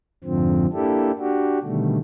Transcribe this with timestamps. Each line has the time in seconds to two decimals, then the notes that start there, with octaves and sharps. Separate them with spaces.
0.24 F2 G#2 D3 F3 C4
0.73 A#3 D4 E4 G4 A4
1.19 D4 F#4 G4
1.63 B2 D3 D#3 G3 A3